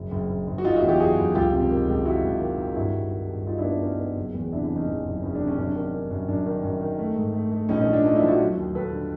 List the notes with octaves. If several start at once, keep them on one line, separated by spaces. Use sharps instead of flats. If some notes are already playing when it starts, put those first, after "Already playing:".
Already playing: F#1
F#1
F#1
F#1
F#4
F#1 D#4 F4
E4 F#4
E2
F4 G4
F#1 F#4 G#4
F#1
C#2 F4 G4
C3
D#3
C#2
D#3 E4 F#4
C#2
D#3
D#3
G2 E4 F#4
G2
D#3
G2
G3 D#4 F4
D4 E4
B3
D4
B3 C#4 D#4
B3
F#1
E2
C3 D4 E4
D4 E4
E3
C#4 D#4
E2
F#1
F#1 C#4
D4
C3
C#4
F#2 D4
C#4
D#3
D#3
F#2
F#2 D4
D#3
F#2
D#3
A3
G#2
A3
A3
A#1 C#4 D#4
C#4 D#4
F3
D4
A3 C#4 D#4
D4 E4
F3
E4 F#4
F#3
D#2
D#2 A4 B4
D3